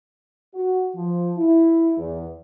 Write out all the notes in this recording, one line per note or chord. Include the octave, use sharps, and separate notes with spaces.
F#4
F3
E4
E2